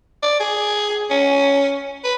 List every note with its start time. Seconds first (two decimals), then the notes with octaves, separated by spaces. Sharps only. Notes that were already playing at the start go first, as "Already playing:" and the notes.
0.23 D5
0.40 G#4
1.10 C#4
2.04 B4